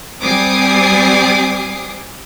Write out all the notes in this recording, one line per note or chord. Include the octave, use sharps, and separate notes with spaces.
G3 C4 G#5 D6 D#6 C7